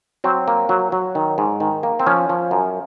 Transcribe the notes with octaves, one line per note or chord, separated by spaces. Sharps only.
F#3 C4
A#3
F#3
F#3
D#3
G#2
D#3
A#3
C4
F3 C#4
F3
F#2